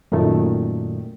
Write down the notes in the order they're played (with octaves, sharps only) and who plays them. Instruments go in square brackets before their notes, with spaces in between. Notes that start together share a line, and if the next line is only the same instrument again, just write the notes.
[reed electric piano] F#2 A#2 D#3 A3